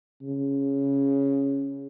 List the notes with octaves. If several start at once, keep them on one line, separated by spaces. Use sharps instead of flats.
C#3